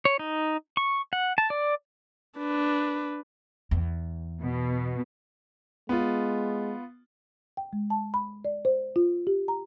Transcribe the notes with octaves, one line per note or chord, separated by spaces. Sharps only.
C#5
D#4
C#6
F#5
A5
D5
D4 B4
E2
B2
G#3 B3 F4
G5
G#3
A5
B5
D5
C5
F4
G4
A#5